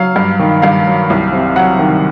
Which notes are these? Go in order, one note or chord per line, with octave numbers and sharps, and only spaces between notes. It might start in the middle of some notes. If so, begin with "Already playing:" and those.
Already playing: F#3 F5
G2
D#3
G2 F5
F#3
C2
C3
F#3 F#5
D#3